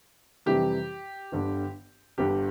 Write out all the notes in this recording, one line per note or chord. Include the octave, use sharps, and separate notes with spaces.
F2 C3 E3 G3 G4
G1 G2 D3
G1 G2 D3 G4